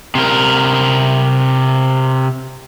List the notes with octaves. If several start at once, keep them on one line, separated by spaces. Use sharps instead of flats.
C3 A#4